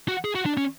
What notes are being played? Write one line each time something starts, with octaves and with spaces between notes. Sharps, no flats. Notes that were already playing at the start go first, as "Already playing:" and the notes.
F#4
G#4
F#4
D4
C#4